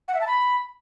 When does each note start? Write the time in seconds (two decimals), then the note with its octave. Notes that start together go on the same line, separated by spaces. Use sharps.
0.08 F#5
0.15 E5
0.21 A5
0.27 B5